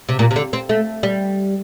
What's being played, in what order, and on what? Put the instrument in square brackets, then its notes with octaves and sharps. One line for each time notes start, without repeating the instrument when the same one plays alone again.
[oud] C3
A#2
C3
D3
C4
A3
G3